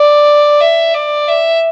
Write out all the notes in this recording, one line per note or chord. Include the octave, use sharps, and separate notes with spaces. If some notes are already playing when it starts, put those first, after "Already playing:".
Already playing: D5
E5
D5
E5